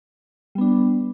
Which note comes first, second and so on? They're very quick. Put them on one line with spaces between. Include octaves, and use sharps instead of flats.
G3 B3 D4